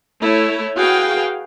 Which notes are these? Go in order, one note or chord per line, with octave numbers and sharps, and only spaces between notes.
A3 E4 C#5
F#4 G#4 B4 F5 G5